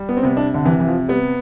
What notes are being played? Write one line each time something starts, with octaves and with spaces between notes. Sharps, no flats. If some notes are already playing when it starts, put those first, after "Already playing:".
Already playing: G3
B3
C4
C3 B3
D4
D3
C3 E3
E3
F3
G3 B3